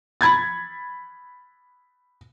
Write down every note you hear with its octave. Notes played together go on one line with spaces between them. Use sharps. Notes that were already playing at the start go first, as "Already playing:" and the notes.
B5 G#6 A6